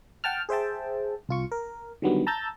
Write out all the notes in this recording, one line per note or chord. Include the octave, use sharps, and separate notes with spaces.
F#5 G5 A5 F6
G#4 C5 E5 G5 A5
C2 F4 C#6
A#4
D3 D#3 F#3 G3 B3
A5 A#5 E6 G6 A6